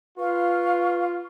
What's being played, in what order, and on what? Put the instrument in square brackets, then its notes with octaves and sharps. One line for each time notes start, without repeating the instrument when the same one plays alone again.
[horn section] F4 [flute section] B4 F5 C#6